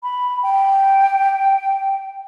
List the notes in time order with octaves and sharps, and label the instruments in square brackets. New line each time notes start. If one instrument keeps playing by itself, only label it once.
[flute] B5
G5